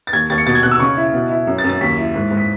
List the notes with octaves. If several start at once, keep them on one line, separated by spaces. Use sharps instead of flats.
A6
D#2 G#6
D#2 A6
C#7
B2 A6
G#6
B2 F#6
E6
C#3 C#6
E4
B2
E4
F#2
A6
F#2
A6
D#2 B6
E4
G#2
G#2
B6